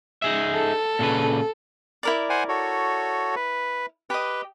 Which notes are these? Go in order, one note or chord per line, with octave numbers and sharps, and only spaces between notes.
D#4 G#4 E5
A4
A#2 C#3 B4
E4 A#4 D5
C5 F#5 G#5
F#4 A4 C#5
B4
G4 B4 D#5